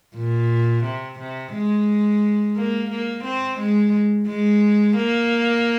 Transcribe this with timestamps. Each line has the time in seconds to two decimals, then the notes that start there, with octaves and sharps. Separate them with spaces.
0.15 A#2
0.85 C3
1.19 C3
1.53 G#3
2.56 A#3
2.91 A#3
3.24 C4
3.59 G#3
4.27 G#3
4.97 A#3